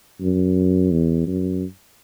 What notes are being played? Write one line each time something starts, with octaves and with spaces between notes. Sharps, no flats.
F#2
E2
F#2